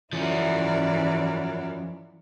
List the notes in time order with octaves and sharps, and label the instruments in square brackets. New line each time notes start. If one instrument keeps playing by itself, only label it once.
[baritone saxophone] F#2 [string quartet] E3 E4 D5 [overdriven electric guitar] F3 C#4